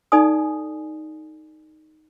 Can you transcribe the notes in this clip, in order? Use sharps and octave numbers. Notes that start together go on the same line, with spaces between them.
D#4 A4 D5 G#5 D#6